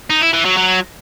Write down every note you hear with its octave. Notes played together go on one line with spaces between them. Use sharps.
D#4
E4
E3
F#3
F#3